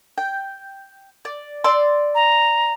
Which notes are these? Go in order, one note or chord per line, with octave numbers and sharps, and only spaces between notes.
G5
D5
D5 C6 E6
A#5